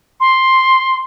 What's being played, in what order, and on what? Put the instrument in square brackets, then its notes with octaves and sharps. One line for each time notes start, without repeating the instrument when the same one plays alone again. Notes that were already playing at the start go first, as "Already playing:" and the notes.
[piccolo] C6